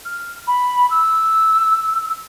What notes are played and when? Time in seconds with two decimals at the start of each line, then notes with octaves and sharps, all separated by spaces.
0.05 F6
0.47 B5
0.91 E6